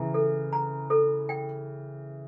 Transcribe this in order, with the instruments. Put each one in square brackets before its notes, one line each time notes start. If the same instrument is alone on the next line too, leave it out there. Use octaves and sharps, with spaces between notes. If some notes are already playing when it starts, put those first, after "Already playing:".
Already playing: [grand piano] C#3 E3 [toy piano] A#5
[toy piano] A4
A#5
A4
G5